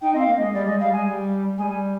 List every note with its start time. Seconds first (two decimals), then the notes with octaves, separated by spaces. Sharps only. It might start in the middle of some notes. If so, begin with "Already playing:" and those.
0.02 D#4 G5
0.13 C4 D#5
0.19 F5
0.27 A#3
0.37 G#3 D#5
0.54 G3 D5
0.67 G#3 D#5
0.80 G3 F5
0.93 G#3 G#5
1.06 G3
1.58 G3 G#3 G#5